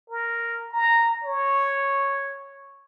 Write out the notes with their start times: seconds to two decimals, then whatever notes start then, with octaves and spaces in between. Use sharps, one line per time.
0.10 A#4
0.71 A#5
1.24 C#5